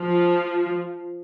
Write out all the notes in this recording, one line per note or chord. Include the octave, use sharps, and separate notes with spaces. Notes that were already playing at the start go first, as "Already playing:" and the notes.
Already playing: F3